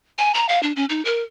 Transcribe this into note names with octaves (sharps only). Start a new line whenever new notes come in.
G#5
A#5
F5
D4
C#4
D#4
A#4